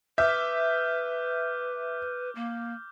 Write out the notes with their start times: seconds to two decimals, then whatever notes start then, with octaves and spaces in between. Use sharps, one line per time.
0.18 B4 E5 D6 F6 G6
2.35 A#3